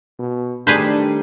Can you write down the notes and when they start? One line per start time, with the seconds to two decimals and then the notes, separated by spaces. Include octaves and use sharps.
0.19 B2
0.67 D#3 G3 A3 D4 G#4 B4 C5